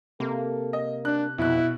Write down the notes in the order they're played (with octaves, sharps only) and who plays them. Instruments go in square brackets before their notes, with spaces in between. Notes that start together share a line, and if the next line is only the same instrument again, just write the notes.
[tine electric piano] C3 [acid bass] A#3 [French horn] A4
[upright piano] D#5
[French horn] D4 [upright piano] F#6
[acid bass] F2 [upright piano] B2 F#6 [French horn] E4